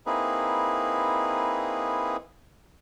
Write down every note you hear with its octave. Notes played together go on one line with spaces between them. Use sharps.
A#3 C4 D#4 E4 G#4 B4